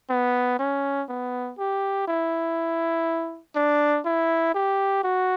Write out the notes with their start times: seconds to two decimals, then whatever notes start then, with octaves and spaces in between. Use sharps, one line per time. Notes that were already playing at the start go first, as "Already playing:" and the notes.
0.10 B3
0.59 C#4
1.08 B3
1.58 G4
2.08 E4
3.55 D4
4.05 E4
4.54 G4
5.04 F#4